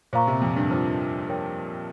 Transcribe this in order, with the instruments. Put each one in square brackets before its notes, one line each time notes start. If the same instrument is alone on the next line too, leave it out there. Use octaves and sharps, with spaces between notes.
[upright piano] A#2 [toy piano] C5 F5 A#5 C#6
[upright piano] C3
F2
G2
F3
[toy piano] A#4 C#5 G5